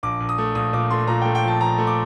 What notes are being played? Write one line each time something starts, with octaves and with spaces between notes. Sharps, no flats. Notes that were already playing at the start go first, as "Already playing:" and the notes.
A#1 D6
A#1
D#6
A3
A#1 D#6
A#2 D6
A3 C6
A#2 A#5
A3 G5
G5
F3 A5
F3 A#5
A3
D6